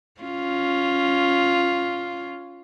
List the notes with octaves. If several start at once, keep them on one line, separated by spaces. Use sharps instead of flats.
C#4 F4